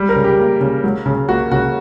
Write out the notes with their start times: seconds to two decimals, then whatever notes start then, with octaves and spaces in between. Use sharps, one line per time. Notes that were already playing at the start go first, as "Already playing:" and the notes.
Already playing: G3
0.09 A#4
0.16 C#3
0.24 G4
0.39 A#3
0.61 C#3
0.84 F#3
1.06 C#3
1.29 A#3 F#4
1.52 C#3 F#4